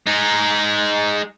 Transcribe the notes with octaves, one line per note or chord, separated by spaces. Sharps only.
G#3 D#4